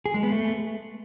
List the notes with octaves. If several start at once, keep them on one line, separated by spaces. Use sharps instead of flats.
G#4
G#3
B3
A3